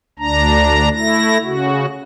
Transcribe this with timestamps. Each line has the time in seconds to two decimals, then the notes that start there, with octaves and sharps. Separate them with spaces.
0.19 D2 D4 A#5
0.94 A3 E4 A#6
1.44 C#3 F#4